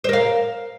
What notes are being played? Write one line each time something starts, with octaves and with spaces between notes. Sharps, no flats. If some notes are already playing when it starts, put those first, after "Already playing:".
A#4 C5 F5